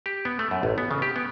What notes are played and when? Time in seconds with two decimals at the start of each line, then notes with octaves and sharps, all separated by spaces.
0.06 G4
0.25 B3
0.39 A3
0.51 F#2
0.63 A1
0.78 B3
0.91 C#3
1.02 G4
1.16 B3